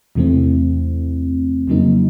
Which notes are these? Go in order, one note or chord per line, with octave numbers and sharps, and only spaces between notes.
E2 C3 E3 A3 C4
F2 C#3 F#3 A#3 D#4